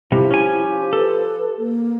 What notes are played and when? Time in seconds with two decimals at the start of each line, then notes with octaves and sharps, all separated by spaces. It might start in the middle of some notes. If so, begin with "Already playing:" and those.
0.12 C3 F3 G3 E4 G4
0.31 C#4 G#5
0.93 A4 B4
1.58 A#3